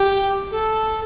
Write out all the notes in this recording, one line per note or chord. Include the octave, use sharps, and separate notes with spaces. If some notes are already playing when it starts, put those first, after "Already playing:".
Already playing: G4
A4